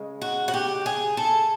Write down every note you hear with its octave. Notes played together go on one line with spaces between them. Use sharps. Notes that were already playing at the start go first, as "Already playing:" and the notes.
Already playing: C#3 G#3
F#4
F#4
G4
G#4
A4